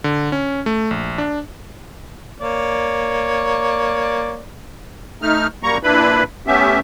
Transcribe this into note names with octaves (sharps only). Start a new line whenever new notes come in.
D3
C#4
A3
A#1
D4
A#3 C#5 D5
A3 D#4 F6
F#2 G3 A#3 A#5 C#6
A#2 D4 E4 B4 B5
A3 B3 C#4 G4 E5